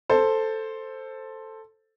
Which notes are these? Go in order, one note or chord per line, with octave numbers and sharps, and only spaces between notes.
A4 C5